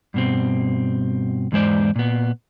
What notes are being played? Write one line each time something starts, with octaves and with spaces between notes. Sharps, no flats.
G2 B2 C4
E2 G#2 G#3 C5 D5
A#2 B3